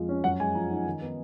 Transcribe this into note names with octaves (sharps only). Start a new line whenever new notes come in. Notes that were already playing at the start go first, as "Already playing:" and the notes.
Already playing: F2 F3 G#3 F5
C#4
F#2 F#5
G#3 G#5
F3 A#5
D#4
D#3
B3